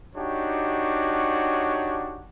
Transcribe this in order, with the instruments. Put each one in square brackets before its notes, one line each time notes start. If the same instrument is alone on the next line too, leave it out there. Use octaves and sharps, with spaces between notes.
[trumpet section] D4 D#4 F#4 G4 C#5